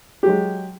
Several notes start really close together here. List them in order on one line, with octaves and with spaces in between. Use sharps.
G4 F#3 G#3